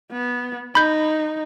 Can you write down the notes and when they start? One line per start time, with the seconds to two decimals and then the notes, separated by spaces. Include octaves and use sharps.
0.12 B3
0.75 D#4 B5 G6